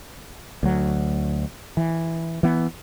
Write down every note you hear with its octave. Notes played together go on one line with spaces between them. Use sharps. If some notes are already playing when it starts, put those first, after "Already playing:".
D2 F#3
E3
E3 B3